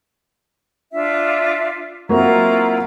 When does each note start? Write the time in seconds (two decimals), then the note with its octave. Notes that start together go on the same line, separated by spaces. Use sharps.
0.93 D4 F4 E5
2.09 F#3 A#3 C4 E4 F4 A#5